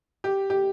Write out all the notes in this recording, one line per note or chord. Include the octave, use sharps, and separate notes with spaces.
G4
G4